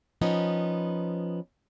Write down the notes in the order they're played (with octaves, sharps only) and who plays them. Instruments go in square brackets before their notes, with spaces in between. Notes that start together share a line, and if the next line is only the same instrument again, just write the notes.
[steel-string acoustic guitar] F3 B3 C#4 D#4